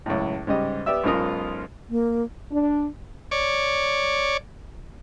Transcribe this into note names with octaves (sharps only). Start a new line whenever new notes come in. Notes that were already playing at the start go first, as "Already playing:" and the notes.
C#2 F#2 A2
G#2 C#3 G3 D#5
B3 G4 D5 E5 E6
B1 G#2 C#4 F4 A#4 D#6
A#3
D4
C#5 D5